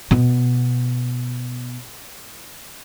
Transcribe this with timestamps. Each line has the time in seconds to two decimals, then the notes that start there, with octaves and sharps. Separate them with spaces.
0.11 B2 B3